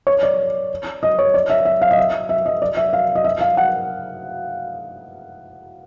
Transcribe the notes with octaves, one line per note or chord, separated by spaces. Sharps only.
C#5
D5
D#5
C#5
D5
E5
E5
F5
D#5
E5
E5
D#5
D5
E5
F5
D#5
E5
F5
F#5